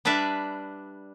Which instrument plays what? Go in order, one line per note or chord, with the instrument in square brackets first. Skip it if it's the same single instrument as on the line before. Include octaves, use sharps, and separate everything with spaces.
[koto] G3 D4 B4 D5 E5